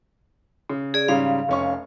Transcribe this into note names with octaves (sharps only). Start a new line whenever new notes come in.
C#3
G#4 D5
G#2 C#3 G3 F5
F1 C#4 C#6